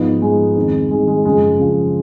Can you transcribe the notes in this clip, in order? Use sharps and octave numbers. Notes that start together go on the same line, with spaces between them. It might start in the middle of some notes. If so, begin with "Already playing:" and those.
Already playing: G#2 F3 B3 D#4
G#2 F3 G#3
F2 D#3
F2 D#3 G#3
G#3
F#2 C#3 F3 G#3
F#2 C#3 F3